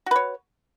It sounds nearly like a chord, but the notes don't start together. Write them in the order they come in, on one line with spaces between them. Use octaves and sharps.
F#4 B4 C#5